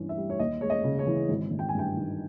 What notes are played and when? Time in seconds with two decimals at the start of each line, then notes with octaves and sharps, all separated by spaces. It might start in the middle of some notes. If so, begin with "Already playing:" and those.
Already playing: G2 E3 C#4
0.09 E5
0.17 G3
0.30 C#5
0.39 D#2 D#5
0.61 G#3 C#5
0.70 D#5
0.84 C#3
0.99 C#5
1.07 E3
1.29 G#1
1.51 G#1
1.59 G5
1.69 G#5
1.75 G2 G5
1.97 D#3